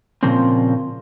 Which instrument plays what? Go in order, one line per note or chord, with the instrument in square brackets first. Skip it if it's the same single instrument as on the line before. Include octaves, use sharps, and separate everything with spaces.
[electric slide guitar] A#2 C#3 F3 A#3 C4